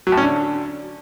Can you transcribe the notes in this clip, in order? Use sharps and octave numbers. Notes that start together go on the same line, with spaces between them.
F#3
A2
C#4
D3